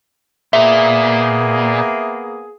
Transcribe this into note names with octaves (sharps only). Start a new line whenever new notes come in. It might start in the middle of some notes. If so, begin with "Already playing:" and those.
A#2 A#3 B3 G#4 E5